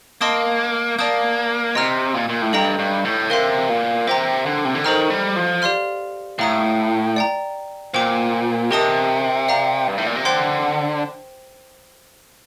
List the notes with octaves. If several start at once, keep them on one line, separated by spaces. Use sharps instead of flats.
A#3 D#5 A5 C6 D#6
A#3 D5 A5 D#6 G6
C3 D#5 A#5 F6
A#2
A#2
A2
G2 A4 D#5 G5 A#5
G2
A2
C3 A#4 F5 C6
A#2
C3 C5 G5 A#5
D3
C3
D3
D#3 A4 C5 D#5 A#5 F6
G3
F3
G4 D5 F5 C6 F6
A2 F5 A#5 D#6
D5 G5 A#5
A#2 C5 G5 D6
C3 G4 A#4 D#5 A5 D#6
D5 F5 A#5
G2
A2
A#2
C3
D3 C5 G5 C6 G6